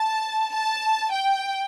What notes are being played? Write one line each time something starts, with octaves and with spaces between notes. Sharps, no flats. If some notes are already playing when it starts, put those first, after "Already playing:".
Already playing: A5
A5
G5